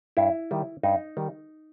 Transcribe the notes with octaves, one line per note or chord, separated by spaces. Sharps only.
G2 E4
D#3 G3
G2 D#4
D#3 G3